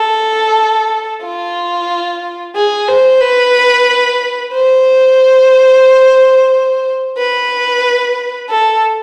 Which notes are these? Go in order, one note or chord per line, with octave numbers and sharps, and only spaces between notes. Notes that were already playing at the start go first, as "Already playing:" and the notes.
Already playing: A4
F4
G#4
C5
B4
C5
B4
A4